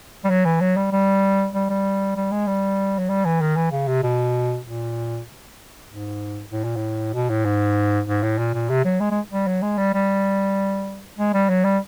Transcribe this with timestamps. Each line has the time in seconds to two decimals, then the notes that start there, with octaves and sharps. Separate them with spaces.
0.24 G3
0.30 F#3
0.45 E3
0.61 F#3
0.76 G3
0.92 G3
1.54 G3
1.70 G3
2.16 G3
2.31 G#3
2.47 G3
2.98 F#3
3.09 G3
3.25 E3
3.41 D#3
3.56 E3
3.71 C#3
3.88 C3
4.03 B2
4.65 A#2
5.89 G#2
6.51 A2
6.64 A#2
6.76 A2
7.14 B2
7.29 A2
7.45 G#2
8.07 G#2
8.23 A2
8.38 A#2
8.54 A#2
8.69 C3
8.85 F#3
9.00 G#3
9.11 G#3
9.31 G3
9.47 F#3
9.62 G#3
9.78 G3
9.93 G3
11.18 G#3
11.33 G3
11.49 F#3
11.64 G3